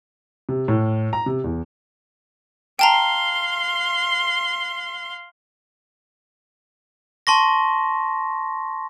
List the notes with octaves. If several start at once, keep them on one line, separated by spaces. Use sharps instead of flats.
C3
A2
A#5
C3
E2
F5 G5 A5 A#5 C6
A5 C6 C#6 A#6